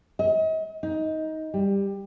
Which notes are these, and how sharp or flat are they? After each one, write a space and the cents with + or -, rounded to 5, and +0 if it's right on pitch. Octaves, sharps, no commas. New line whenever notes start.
D#5 +40
D#4 +15
G3 +15